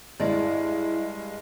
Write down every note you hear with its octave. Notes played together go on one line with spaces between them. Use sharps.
G2 G#3 E4 D5